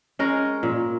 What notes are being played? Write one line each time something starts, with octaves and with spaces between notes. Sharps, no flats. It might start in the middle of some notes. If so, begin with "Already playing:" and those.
G#3 C#4 A#4
A#2